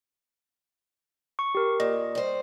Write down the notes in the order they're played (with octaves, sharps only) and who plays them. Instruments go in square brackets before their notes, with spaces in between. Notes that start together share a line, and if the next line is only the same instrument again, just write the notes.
[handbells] C#6
G4 A#4
[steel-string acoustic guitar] A#2 [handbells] D#5
[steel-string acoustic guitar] G3 C5